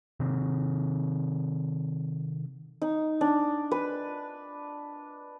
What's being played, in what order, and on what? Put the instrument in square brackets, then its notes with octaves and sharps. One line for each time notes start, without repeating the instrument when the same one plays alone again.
[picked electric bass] C3 D#3 C4
[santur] D#4
D4
B4